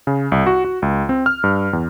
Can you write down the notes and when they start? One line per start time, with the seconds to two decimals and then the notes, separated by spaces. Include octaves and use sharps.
0.07 C#3
0.32 C2
0.47 F#4
0.65 F#4
0.82 C#2
1.09 C4
1.26 F6
1.44 G2
1.73 E2